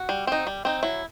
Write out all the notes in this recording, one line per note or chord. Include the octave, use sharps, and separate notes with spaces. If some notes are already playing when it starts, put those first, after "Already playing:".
Already playing: F#4
G3
C4 D#4
G3
C4 D#4
F#3 E4